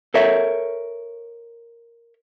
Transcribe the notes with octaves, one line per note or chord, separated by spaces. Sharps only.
A4 A#4 C#5 E5